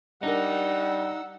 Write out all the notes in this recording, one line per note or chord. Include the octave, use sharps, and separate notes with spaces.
G3 D4 D#4 A#4 F#5 E6